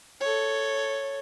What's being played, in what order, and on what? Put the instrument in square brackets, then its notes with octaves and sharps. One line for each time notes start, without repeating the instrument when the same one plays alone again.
[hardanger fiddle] A4 C#5